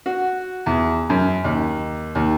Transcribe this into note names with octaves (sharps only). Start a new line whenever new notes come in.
F#4
E2
F#2
D#2
D#2